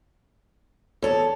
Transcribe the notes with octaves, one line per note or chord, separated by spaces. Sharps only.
E2 A4 C#5